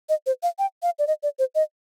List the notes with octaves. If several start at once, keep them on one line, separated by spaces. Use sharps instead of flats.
D#5
C5
F5
G5
F5
D5
D#5
D5
C5
D#5